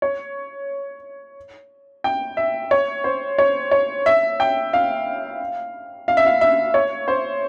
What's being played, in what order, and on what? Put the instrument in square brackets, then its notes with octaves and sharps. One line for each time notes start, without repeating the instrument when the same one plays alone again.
[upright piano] C#5
G5
E5
C#5
C5
C#5
C#5
E5
G5
F5
F5
E5
F5
E5
C#5
C5